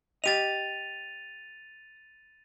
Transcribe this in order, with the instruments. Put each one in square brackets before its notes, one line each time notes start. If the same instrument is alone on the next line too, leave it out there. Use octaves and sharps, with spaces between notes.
[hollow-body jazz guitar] G4 D#5 [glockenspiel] A6 D#7 F7